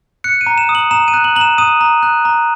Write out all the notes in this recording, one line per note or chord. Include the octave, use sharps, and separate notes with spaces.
F#6 C#7
D#7
A#5
E7
D#6
F#7
A#5 E7
D#7
F#6
F#7
A#5 F#7
E7
D#6 D#7
A#5
F#6
A#5